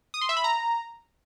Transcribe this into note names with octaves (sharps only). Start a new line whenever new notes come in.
D#6
C6
E5
B5
A#5